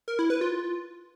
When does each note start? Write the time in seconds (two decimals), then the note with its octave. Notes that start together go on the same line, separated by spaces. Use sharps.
0.08 A#4
0.19 E4
0.30 B4
0.41 F4